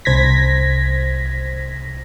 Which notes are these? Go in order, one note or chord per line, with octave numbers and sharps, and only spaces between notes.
C2 C5 G#6 A#6 B6